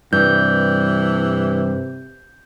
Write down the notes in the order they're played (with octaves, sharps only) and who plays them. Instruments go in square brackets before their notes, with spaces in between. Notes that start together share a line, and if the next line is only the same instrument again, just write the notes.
[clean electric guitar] G2 G3 [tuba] C3 [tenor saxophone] E3 [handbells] G6